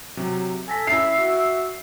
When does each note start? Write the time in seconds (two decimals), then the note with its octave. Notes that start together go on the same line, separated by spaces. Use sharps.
0.17 C3 F#3
0.68 A4 G#5 A#6 B6
0.87 C#4 E4 E5 E6 C7
1.18 F#4